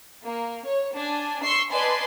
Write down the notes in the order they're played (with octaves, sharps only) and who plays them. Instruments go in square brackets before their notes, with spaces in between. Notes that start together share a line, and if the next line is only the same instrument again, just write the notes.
[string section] A#3
C#5
D4 G#5
C6 C#6 E6 C7
B4 D5 D#5 G#5 A5 C6